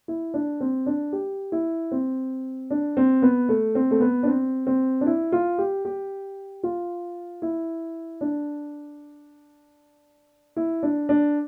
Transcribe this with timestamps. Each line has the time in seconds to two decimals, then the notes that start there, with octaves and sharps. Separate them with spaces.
0.08 E4
0.34 D4
0.60 C4
0.86 D4
1.13 G4
1.52 E4
1.91 C4
2.70 D4
2.97 C4
3.22 B3
3.49 A3
3.75 C4
3.91 A3
4.00 B3
4.23 D4
4.27 C4
4.67 C4
5.01 D4
5.06 E4
5.32 F4
5.58 G4
5.85 G4
6.63 F4
7.42 E4
8.21 D4
10.56 E4
10.83 D4
11.09 D4